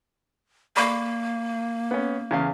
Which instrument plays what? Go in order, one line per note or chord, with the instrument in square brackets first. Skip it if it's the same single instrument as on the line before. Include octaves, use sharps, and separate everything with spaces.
[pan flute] A#3 [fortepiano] D5 B5 C#6
[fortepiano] B3 C#4
E2 C#3 F5